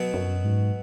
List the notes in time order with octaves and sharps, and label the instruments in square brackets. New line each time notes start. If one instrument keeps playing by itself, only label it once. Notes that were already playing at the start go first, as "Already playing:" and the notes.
Already playing: [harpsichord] B2 F#3 B3
[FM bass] F#2
G#2